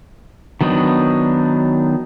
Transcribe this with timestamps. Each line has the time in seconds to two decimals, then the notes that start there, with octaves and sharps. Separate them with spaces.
0.61 D#3 F#3 B3 D4 D#4